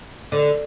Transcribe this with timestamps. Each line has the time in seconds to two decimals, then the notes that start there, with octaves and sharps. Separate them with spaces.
0.32 D3